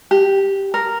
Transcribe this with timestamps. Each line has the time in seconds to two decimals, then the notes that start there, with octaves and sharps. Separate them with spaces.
0.11 G4
0.74 A#4